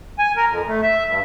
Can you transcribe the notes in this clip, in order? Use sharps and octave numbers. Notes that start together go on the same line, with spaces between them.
G#5
A#4
F2
A3
E5
G2